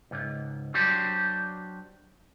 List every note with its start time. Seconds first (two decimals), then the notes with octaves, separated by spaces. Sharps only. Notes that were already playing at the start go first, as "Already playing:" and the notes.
0.11 C#2 G#2
0.74 F#3 D4 G4 C5